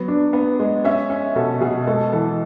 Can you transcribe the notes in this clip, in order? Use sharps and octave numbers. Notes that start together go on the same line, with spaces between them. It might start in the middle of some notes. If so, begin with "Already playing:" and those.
Already playing: F#3 B3
D4
B3
G#3
C#4 E5
C#4
B2 A4
B2 G#4
G#3 A4
E3 A4